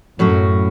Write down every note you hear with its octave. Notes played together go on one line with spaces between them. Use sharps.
F#2 A2 F#3 C#4 F#4